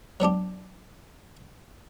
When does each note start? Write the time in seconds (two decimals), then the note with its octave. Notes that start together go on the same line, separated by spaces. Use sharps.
0.20 F#3 B3 D4 G4